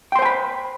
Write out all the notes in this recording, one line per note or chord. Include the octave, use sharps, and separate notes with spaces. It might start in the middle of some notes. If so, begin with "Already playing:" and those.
C5 G5 G#5 B5 C6